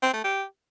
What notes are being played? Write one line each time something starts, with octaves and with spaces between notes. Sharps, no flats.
C4
A3
G4